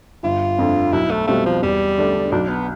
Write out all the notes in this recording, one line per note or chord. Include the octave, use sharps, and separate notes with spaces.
G1 F4
F2 D3 A3
B1 E4
A3
B2 G3 A3 C4 F4
F3
E2 G3
D3 A3 D4
B1 D4
B3